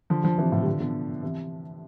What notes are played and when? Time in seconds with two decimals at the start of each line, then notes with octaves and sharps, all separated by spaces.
0.10 D3 F3
0.24 D3 F3
0.38 C3 E3
0.52 A2 C3
0.62 G3
0.66 D3 F3
0.80 B2 D3
1.22 C3 E3